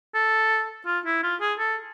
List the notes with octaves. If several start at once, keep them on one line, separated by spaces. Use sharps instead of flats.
A4
F4
E4
F4
G#4
A4